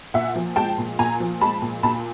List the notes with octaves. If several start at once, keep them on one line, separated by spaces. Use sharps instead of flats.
A#2 E5 F#5
F3
G#3 G5 A5
A#2
A#2 G#5 A#5
F3
G#3 A5 B5
A#2
A#2 A5 B5